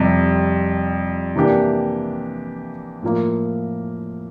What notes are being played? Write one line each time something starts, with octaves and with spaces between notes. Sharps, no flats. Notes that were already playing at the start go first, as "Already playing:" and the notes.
Already playing: F2 C3 G3
C3 E3 A#3 D4 G4
A2 F3 A#3 F4